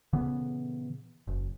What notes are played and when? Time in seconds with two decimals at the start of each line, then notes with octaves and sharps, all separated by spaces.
0.13 A#2 C#3 E3 B3
1.27 F#1